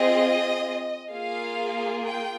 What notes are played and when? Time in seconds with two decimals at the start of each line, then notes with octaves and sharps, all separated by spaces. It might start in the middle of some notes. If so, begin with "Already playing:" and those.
Already playing: C4 F4 G#4 D#5
1.11 A#3 F4 G#4 F5
2.04 G5